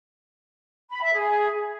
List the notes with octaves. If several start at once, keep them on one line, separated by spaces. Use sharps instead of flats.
B5
E5
G#4